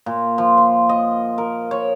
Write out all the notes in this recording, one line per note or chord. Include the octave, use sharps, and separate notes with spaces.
A#2
F3
C6
D#5
A#4
C#5